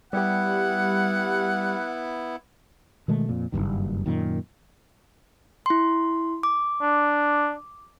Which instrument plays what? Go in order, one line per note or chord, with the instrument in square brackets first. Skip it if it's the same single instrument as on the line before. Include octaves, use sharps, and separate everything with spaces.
[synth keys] G3 G4 [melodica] B3 E4 [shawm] F#5
[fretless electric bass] B2 D#3 G#3 A3
F2 A#2
F#1 C2 G2 D#3
F#2 A#2 D#3
[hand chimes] E4 C6
D6
[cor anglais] D4